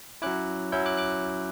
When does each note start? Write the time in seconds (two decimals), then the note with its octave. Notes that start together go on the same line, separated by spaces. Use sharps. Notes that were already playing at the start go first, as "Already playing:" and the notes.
0.22 F#3 C#4 E4 D6 F#6
0.72 F#3 C#4 E4 E6 G6
0.86 D6 F#6
0.97 D6 F#6